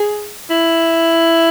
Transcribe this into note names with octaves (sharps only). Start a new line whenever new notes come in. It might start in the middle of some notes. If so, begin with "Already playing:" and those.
Already playing: G#4
E4